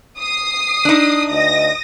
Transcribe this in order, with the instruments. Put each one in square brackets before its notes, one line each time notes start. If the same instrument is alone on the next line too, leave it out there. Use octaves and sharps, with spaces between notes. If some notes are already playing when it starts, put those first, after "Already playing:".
[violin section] D#6 C7
[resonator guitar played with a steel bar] D4 D#4
[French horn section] D2 D#5 [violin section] D#6 A#6